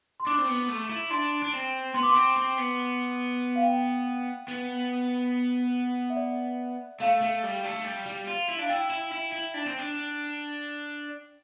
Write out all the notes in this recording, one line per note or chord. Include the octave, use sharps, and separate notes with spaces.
C6
D4 D6
C4
B3
A3
E4
D4 C6
D4
C4
B3 C6
D6
C6
C4
C4
B3
F5
G5
B3
E5
D5
A3 F5
A3
G3
A3
G3
G3
F4
E4
D4 F5
E4 G5
E4
E4
E4
D4
C4
D4